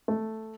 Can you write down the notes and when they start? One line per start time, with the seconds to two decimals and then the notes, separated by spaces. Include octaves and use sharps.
0.08 A3